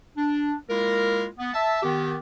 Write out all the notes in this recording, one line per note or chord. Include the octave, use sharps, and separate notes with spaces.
D4
G#3 A#3 E4 F4 A#4
B3
E5 A5
D#3 B3 G4